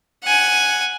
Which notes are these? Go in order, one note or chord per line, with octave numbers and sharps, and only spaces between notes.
F#5 G#5